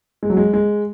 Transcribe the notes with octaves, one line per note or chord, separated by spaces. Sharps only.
G#3
F#3
G#3
G#3